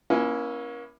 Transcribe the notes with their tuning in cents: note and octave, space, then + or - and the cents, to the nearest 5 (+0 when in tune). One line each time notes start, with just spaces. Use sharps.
A#3 +40 C#4 +0 E4 -5